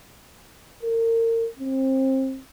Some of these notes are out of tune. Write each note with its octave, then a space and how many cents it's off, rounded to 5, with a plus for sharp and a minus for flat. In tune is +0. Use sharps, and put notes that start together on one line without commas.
A#4 -35
C4 +25